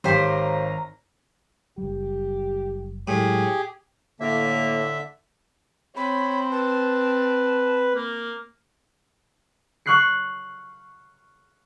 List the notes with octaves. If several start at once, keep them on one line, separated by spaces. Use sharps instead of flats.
G#1 G4 C5 C#5 F5 A#5
F#1 G3 G4
A2 F#3 G#3 G4 G#4
A2 D3 A#3 E5
C4 C#5 B5
B4 A5
A#3
C#6 F6 F#6 C7 C#7